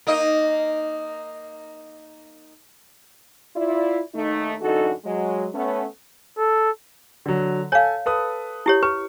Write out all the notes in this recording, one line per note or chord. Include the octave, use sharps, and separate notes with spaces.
A#3 D#4 D#5
E4 F4 D5
D#2 A3 D#4
F#2 D3 E3 D#4 F#4 A4
F#3 G#3
A3 B3 C#4
A4
D3 F#3
A4 C#5 F5 G#5
A4 B4 D#6
E4 G4 C#5
B4 C#6